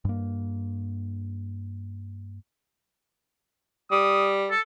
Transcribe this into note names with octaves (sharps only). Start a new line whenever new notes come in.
G2 A#3
G3 D#6
A4